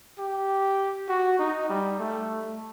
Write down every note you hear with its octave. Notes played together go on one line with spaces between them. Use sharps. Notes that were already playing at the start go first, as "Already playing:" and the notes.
G4
F#4
D#4
G3
A3